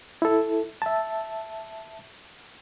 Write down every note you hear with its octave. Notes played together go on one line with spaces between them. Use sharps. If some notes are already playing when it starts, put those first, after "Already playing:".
E4 A4
E5 A5